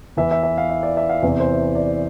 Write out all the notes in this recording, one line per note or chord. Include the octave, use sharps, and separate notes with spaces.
E2 E3 E5
E5
E5
F5
E5
D5
E5
F5
E2 C3 E3 E5
C5
D5